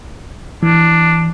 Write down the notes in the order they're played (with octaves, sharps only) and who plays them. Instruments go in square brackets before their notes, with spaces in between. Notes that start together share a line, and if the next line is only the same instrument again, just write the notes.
[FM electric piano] E3 [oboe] D4